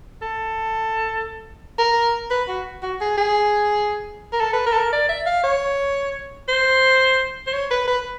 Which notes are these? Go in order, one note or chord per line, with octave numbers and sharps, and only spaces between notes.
A4
A#4
B4
F#4
F#4
G#4
G#4
A#4
A4
B4
A#4
A4
A#4
D5
E5
F5
C#5
C5
C5
C#5
B4
B4